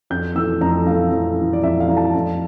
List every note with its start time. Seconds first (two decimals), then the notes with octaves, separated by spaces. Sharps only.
0.10 F2 G6
0.35 E3 A3 E6
0.61 F2 A#5
0.86 E3 A3 F5
1.12 F2
1.38 E3 A3
1.53 D5
1.63 F2 E5
1.80 F5
1.89 E3 A#5
1.92 A3 A5
2.14 F2